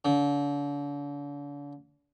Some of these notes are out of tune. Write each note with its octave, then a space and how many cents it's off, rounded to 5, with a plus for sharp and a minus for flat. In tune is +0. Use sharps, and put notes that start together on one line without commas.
D3 -40